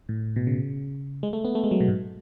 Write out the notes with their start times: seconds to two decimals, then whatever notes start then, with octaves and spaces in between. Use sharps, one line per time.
0.09 A2
0.36 B2
0.47 C#3
1.23 G#3
1.33 A3
1.45 B3
1.55 A3
1.64 G#3
1.71 F#3
1.80 B2
1.88 G#2